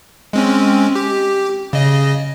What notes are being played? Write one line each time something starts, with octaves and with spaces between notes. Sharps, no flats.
G#3 C4 C#4
G4
C#3 D#5